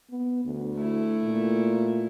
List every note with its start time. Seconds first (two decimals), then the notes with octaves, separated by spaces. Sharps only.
0.10 B3
0.45 D2
0.75 A3 E4
1.23 A#2